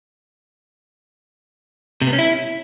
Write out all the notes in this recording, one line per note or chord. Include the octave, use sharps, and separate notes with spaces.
C3
B3
C#4
E4